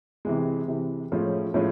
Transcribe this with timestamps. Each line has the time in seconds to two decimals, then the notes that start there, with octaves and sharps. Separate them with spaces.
0.25 C3 E3 G#3
0.68 C3 E3 G#3
1.12 A2 F3 G#3 C#4 E4
1.54 A2 F3 G#3 C#4